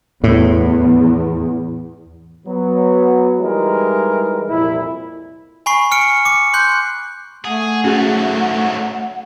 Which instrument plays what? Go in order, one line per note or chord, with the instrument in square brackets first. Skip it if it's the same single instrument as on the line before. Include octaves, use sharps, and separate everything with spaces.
[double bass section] E2 [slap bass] A2
[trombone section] F#3 B3
E3 G3 G#3 D#4 E4 A#4
C2 F2 A#2 E4
[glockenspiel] G#5 B5 C#6 C7
F6 C#7 D7
D6 C#7
C6 F#6 G6
[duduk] A3 [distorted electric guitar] G#4 [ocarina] F#5
[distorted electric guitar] G#2 F#3 [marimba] C#4 F#4 G#4